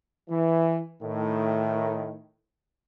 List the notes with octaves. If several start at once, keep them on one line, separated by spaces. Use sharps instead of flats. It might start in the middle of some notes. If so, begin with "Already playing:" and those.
E3
A2 D#3